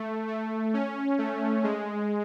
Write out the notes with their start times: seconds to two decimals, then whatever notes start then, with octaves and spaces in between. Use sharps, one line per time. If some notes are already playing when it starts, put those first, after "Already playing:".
Already playing: A3
0.28 A3
0.74 C#4
1.18 A3
1.64 G#3